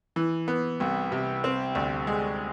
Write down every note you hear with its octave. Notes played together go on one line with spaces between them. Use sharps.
E3
B3
C2
C3
C4
D2
G#3